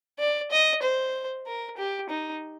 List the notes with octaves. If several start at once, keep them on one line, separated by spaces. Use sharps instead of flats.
D5
D#5
C5
A#4
G4
D#4